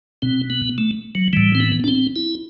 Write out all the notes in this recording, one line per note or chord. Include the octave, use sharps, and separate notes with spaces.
B2 C4
B3
A3
F#3
A2 E3 G3
C4
B3
D4
C4
E4